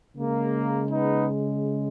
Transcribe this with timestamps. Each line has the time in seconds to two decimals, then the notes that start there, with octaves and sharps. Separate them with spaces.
0.16 C#3 G#3 A#3
0.91 B3 D#4